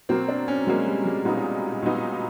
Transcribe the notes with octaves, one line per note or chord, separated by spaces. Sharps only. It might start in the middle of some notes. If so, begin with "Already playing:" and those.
B2 F#3 A#3 C4
D4
C#4
B2 F#3 G#3 A#3
G3
G#3
A#2 F#3 B3 D#4
A#2 F#3 B3 D#4